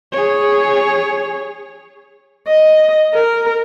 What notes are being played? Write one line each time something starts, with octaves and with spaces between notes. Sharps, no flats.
G#4 C#5
D#5
A#4